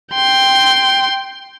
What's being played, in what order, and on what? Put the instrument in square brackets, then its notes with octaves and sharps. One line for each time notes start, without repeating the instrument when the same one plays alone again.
[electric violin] G5 C6